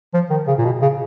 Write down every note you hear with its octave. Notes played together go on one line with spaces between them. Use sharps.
F3
D#3
C#3
A#2
B2
C#3